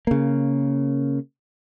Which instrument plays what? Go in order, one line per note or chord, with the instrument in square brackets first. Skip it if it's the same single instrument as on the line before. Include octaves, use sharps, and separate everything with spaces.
[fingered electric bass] C#3 A#3